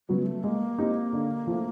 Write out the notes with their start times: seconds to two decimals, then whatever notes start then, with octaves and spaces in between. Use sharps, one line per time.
0.09 C#3 F#3 G#3 B3
0.26 A3
0.43 G#3 A#3
0.78 C4 D#4 G4
1.13 D3
1.47 F3 A3